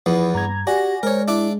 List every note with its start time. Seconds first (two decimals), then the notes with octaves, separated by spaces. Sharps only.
0.06 E2 F3 B3 E4
0.35 G2 A#5 G#6
0.67 F#4 G4 D5 G#5 A#6
1.03 G#3 A#4 C5 C#5
1.28 D4 E4 E5 D6